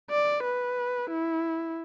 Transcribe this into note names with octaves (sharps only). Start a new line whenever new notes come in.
D5
B4
E4